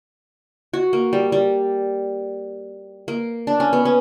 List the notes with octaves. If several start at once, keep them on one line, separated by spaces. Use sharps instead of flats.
F#4
A#3
G3
G3
A#3
D4
C#4
B3
C#4